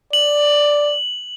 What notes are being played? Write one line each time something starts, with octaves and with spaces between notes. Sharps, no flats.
D5 F#7